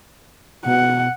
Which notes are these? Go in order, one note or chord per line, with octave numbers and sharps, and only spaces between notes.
B2 F#5